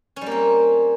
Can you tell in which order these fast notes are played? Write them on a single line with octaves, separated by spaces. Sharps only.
C#4 G3 A#3 C4